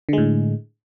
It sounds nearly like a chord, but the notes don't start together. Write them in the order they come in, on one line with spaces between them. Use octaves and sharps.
D3 G#3 A2